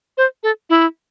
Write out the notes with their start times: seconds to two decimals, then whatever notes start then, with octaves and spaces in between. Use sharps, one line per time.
0.18 C5
0.43 A4
0.70 E4